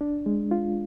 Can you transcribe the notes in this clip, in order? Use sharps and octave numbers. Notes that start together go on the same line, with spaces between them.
D4
G#3
F4